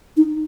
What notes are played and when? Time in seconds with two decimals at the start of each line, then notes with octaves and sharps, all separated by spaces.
0.17 D#4